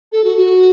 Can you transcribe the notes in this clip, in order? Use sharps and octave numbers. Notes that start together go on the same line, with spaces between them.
A4
F#4
F#4